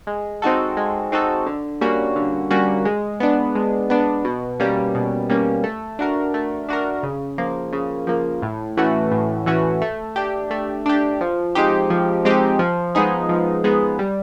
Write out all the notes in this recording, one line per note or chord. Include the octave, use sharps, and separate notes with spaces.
G#3
C4 D#4 F#4 A4
G#3
C4 D#4 F#4 A4
D3
G3 A#3 C#4 F#4
D3
G3 A#3 C#4 F#4
G#3
B3 D4
G#3
B3 D4
B2
G3 A#3 C#4
B2
G3 A#3 C#4
A3
D4 F#4 A#4
A3
D4 F#4 A#4
C#3
F3 A#3
C#3
F3 A#3
A2
E3 A3 C#4 F#4
A2
E3 A3 C#4 F#4
A3
D4 G4
A3
D4 G4
F3
G#3 C4 D#4 G4
F3
G#3 C4 D#4 G4
F3
G#3 B3 D#4 G#4
F3
G#3 B3 D#4 G#4
G3